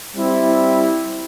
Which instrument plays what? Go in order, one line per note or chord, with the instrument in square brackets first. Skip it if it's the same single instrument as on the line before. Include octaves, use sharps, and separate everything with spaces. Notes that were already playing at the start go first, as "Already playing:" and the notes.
[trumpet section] G3 C4 E4